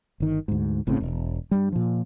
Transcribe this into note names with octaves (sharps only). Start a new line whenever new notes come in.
G1 D#3
D2 G#2
G1 A2 C#3 C4
E1
G2 G3
A#2 F3